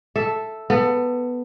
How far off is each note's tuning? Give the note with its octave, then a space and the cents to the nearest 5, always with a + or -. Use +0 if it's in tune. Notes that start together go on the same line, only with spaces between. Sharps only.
A4 +0 E5 +0
B3 +0 A4 +20